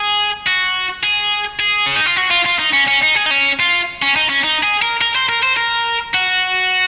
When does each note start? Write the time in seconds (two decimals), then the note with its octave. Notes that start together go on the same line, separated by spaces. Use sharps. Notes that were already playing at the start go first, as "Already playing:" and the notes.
Already playing: G#4
0.46 F#4
1.03 G#4
1.59 G#4
1.86 C#4
1.96 D#4
2.06 F4
2.17 F#4
2.31 F4
2.46 F4
2.59 D#4
2.73 C#4
2.88 C#4
3.03 D#4
3.16 G#4
3.26 D#4
3.31 C#4
3.59 F4
4.02 C#4
4.16 D#4
4.29 C#4
4.44 D#4
4.63 G#4
4.82 A#4
5.01 A#4
5.15 C5
5.29 A#4
5.43 C5
5.57 A#4
6.15 F#4